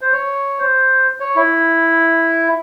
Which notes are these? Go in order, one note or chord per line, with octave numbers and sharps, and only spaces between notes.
C5
C#5
C5
C#5
E4